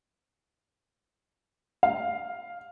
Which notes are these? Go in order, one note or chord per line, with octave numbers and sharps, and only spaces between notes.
F5